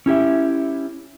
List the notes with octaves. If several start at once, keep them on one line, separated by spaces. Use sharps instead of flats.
C#4 E4 G4 E5